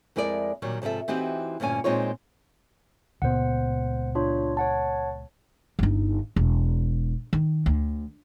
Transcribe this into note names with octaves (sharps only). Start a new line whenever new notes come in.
F2 G#3 E4 A#4 D5
A#2 D#3 F#3 G3
G#2 C3 F3 A4 E5
E3 C4 D#4 F#4 G4
D2 G2 A#2 C#4 G#5
A#2 G#3 C4 D#4 F4 C#5
C#2 A#2 B3 C5 F#5
D4 F4 C#5
C#5 F#5 A5
G1 D#4
E1
D#3
D2